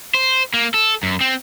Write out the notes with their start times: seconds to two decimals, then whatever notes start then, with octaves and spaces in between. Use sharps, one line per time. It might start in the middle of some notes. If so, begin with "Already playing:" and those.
0.14 C5
0.54 A#3
0.74 A4
1.03 F#2
1.21 C4